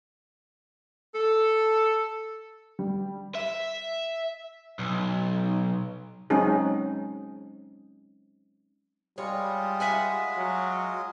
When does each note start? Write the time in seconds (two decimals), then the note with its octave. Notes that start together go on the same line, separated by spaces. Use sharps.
1.14 A4
2.79 G3
3.35 E5
4.79 B1
6.30 F#3 G#3 C4 C#4 D#4 G#4
9.18 G3 G#3 F4 C#5 D#5
9.80 E5 F#5 G#5
10.37 F#3